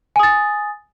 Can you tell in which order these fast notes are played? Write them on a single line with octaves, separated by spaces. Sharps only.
G#5 D#6 A6